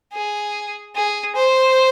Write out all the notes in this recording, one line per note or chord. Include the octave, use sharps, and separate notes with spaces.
G#4
G#4
C5